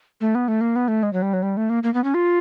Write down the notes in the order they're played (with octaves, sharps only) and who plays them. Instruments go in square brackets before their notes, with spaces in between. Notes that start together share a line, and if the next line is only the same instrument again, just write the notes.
[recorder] A3
B3
A3
A#3
B3
A3
G#3
F#3
G3
F#3
G3
A3
A#3
A#3
B3
C#4
F4